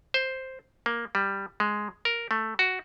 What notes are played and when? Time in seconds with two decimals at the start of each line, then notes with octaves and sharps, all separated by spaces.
0.14 C5
0.86 A#3
1.15 G3
1.60 G#3
2.05 A#4
2.31 A3
2.59 F#4